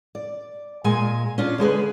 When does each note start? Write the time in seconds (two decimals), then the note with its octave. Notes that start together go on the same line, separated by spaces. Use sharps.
0.15 D5
0.84 A#2 G#3 G#5
1.38 C#4 D4 F4
1.58 D3 G#3 G#4 B4